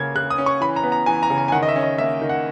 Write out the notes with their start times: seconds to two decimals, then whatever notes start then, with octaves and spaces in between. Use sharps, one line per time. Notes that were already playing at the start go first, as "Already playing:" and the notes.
Already playing: C#3 A#3 G#6
0.15 C#3 F#6
0.30 D#6
0.38 C#4
0.46 C#6
0.61 E3 B5
0.76 A#5
0.83 B3
0.92 A#5
1.06 E3 G#5
1.23 A#5
1.30 C#3
1.38 G#5
1.48 G#5
1.52 D#3 F#5
1.63 D#5
1.69 E5
1.76 C#4
1.83 D#5
1.98 A#3 E5
2.22 D#3
2.29 F#5